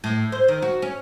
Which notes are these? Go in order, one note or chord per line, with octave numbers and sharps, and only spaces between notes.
A2
C5
D#3
F#4
C#4